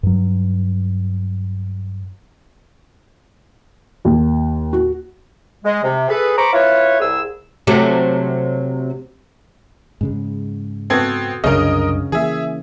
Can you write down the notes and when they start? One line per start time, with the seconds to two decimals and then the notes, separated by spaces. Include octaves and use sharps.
0.03 G2 F#3
4.05 D#2
4.73 F#4
5.64 G#3
5.82 C3
6.08 G#4 A4 B4
6.37 C5 A#5 B5 C#6 D6
6.53 E4 F4 B4 C#5
7.00 C2 G#4 E6
7.67 C3 F#3 A3
10.01 G#2 C#3 G#3
10.90 B3 C4 F#4 A4 G#6
11.44 C2 F#2 C#3 C#4 D4 A#4 D#5
12.12 E3 A#3 G#4 E5